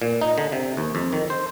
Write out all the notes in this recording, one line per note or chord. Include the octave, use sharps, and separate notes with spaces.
A#2
D#4
D3
C3
D#2
F2
D#3
C5